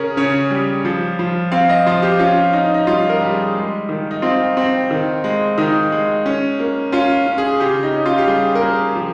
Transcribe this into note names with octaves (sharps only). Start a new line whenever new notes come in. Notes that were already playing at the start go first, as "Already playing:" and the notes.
Already playing: C#3 C#4 G#4 A#4
C#3 C#5
G3
F3
F3
C4 F5
D#5
F3 F4
G4
C#4 F4
C#4 D#4
D#4
G3 F4
A#4
G3
G#4
G#3
D#3
D#4
C4 F4
C4
D#3
G#3
D#3 D#4
G#3
C#4
A#3
C#4 F4
C#4
G#4
C#3 G4
D#4
C#4
F4
G4
G3 G#4
A#4
A#3 G#4
F3